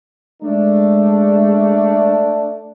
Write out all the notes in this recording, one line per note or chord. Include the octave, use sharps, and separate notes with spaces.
G#3 A3 D4